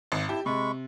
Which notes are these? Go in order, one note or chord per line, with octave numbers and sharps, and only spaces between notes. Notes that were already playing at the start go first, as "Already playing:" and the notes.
G#1
E4 G4 A5
C3 G#3 B5 C#6